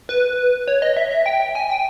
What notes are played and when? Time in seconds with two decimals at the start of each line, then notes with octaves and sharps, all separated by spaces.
0.09 B4
0.68 C#5
0.82 D#5
0.97 E5
1.11 E5
1.26 G5
1.55 G#5
1.70 G5